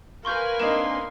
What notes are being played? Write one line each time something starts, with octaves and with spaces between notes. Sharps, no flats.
A#4 B4 F5 G#5 C6 C#6 G6
A#3 C4 D4 D#4 C6 E7